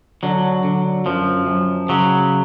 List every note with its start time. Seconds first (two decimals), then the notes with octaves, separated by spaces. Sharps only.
0.23 D3 F#3
0.64 D3
1.06 F#2 F3
1.47 F#2
1.89 C#3 F#3